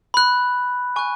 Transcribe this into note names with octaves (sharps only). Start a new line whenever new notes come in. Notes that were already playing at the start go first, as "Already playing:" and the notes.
B5 F#6
G#5 C#6 F#6